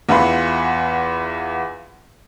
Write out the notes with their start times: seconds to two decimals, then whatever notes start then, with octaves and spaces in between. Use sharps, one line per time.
0.09 E2 E3 F4 F#5 B5 C6